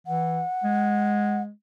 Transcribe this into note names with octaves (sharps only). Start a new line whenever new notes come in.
E3 F#5
G#3